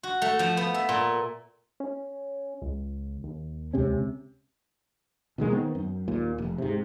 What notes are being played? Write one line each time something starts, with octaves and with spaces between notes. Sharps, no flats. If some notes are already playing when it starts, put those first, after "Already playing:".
F#4
A3
F3
B3
E5
A#2
C#4
C#2
D#2
C#2 C3 C#4
B2 D#3 G#3 A#3
D#3 B3 C4
F#2
D#2 A#2
F1
G#2 C3